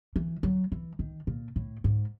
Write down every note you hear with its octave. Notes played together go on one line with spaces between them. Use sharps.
E3
F#3
E3
D#3
A#2
A2
G#2